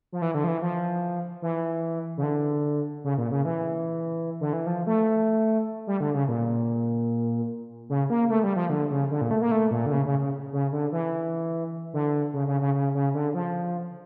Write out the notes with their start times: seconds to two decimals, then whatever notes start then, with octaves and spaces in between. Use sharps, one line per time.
0.12 F3
0.22 E3
0.34 D3
0.44 F3
0.48 E3
0.62 F3
1.42 E3
2.17 C#3
2.23 D3
3.04 C#3
3.18 A#2
3.31 C#3
3.45 E3
4.41 D3
4.53 E3
4.67 F3
4.87 A3
5.87 G3
6.00 D3
6.14 C#3
6.28 A#2
7.89 C#3
8.10 A#3
8.30 A3
8.43 G3
8.56 F3
8.70 D3
8.90 C#3
9.11 D3
9.21 A#2
9.31 A3
9.41 A#3
9.51 A3
9.71 A#2
9.86 D3
9.92 C#3
10.05 C#3
10.19 C#3
10.53 C#3
10.72 D3
10.92 E3
11.93 D3
12.34 C#3
12.47 C#3
12.61 C#3
12.74 C#3
12.95 C#3
13.14 D3
13.34 F3